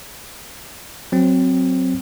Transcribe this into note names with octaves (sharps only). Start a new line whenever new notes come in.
F#3 C4